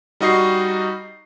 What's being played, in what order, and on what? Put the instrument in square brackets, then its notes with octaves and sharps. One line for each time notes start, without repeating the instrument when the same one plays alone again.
[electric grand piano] G3 D#4 F#4 D#5 C#6 C7